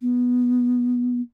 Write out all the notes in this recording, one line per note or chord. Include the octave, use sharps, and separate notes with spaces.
B3